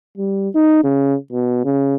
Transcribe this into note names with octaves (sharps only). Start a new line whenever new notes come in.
G3
D#4
C#3
B2
C#3